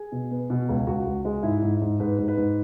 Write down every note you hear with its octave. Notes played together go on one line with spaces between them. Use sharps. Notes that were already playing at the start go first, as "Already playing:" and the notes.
Already playing: G#4
B2
B3
B2
C#2
C#2 F#4
C#2
G#3
G#2 E4
G#2
G#2
G#2 B4
G#2
B4
G#2